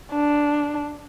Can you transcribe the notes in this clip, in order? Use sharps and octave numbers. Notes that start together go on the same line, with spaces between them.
D4